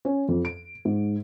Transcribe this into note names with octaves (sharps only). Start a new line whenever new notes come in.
C#4
F2
D7
G#2